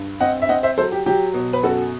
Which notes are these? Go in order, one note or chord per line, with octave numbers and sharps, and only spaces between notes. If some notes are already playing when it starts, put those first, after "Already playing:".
Already playing: G2
C4 D#5 F#5
E5
C4 D#5 F#5
C5 E5
F#3 A4 C5
G4
F#3 G4
B2
B4
F#2 F#4 A4